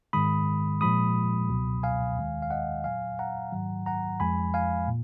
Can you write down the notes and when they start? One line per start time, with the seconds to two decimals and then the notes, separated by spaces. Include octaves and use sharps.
0.13 G#2 D#3 G#3 B5 D#6
0.81 A#2 F3 G#3 B5 D#6
1.49 C#2 B2 F#3
1.83 F5 G#5
2.18 D#2 D#3 G#3
2.42 F5
2.51 D#5 F#5
2.84 A#2 F#3 F5 G#5
3.19 F#5 A#5
3.52 G#2 D#3 F#3
3.86 F#5 A#5
4.20 F2 F3 G#3 G#5 B5
4.54 F5 G#5
4.88 A#2